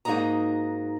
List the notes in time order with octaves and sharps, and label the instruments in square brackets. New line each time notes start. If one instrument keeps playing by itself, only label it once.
[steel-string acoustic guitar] G#2 A#3 D#4 F#4 D#5 A#5